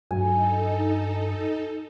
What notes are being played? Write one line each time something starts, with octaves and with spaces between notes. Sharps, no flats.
G2 F#3 D#4 A4 G#5